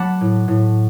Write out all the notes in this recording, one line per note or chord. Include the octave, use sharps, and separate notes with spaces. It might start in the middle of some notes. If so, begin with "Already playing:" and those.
Already playing: F#3 A3 F#5 A5 B5 D6
A2
A2